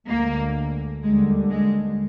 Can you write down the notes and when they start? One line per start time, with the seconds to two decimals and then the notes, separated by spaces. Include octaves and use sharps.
0.08 D2 D3 G#3 A#3
1.03 D#2 D3 G3 G#3
1.51 G#3